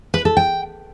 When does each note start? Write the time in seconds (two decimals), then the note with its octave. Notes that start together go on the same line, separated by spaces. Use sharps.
0.14 B4
0.25 A4
0.37 G5